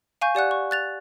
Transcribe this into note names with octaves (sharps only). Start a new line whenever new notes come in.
F5 G#5 C#6 G6
G4 D5 F#5 F#6
C#6
F#6 A6 F7